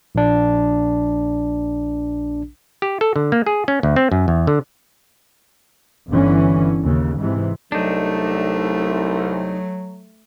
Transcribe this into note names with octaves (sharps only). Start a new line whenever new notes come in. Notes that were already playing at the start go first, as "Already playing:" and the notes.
A#1 D4
G4
A4
D3
A#3
G#4
C#4
D2
C4
F#2
E2
D3
G1 G2 D3 E3 C#4
D#2 C#3
G#2 C3 E3
C2 F#3 A3 D4 D#4